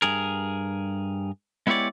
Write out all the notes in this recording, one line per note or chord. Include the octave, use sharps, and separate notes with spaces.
G2 G#4 A#4
G#3 B3 E4 G4 C#5 D5